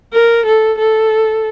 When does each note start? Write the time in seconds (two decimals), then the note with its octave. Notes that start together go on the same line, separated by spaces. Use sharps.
0.13 A#4
0.46 A4
0.78 A4